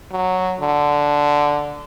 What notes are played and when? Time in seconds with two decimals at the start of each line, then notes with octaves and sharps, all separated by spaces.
0.12 F#3
0.60 D3